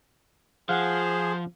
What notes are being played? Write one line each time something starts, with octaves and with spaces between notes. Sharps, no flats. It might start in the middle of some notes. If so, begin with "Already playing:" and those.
F3 G#4 C5 F5 F#5